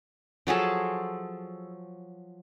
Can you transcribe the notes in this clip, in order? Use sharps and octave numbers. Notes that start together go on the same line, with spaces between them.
F3 F#3 G#4 A4